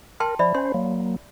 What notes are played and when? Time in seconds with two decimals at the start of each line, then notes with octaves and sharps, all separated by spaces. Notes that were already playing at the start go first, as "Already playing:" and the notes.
0.20 A#4 G5 A5 C6
0.39 F3 D5 E5 B5
0.55 C#4 C5 C6
0.74 F#3 A#3